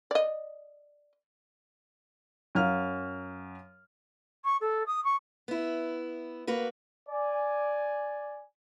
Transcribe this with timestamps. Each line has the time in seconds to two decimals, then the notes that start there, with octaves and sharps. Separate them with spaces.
0.11 D5 D#5
2.55 F#2 F5 F6
4.45 C#6
4.61 A4
4.87 D#6
5.05 C#6
5.48 B3 E4
6.47 A#3 F#4 B4
7.09 D5 G#5